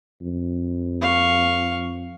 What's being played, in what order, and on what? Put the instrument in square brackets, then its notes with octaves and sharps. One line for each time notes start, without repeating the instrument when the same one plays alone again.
[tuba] F2
[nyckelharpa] F5 C#6